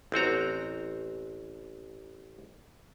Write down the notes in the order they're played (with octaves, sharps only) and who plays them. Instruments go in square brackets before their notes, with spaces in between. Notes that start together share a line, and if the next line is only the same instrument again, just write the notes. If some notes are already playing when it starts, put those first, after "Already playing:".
[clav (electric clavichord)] A1 C4 F#4 A#5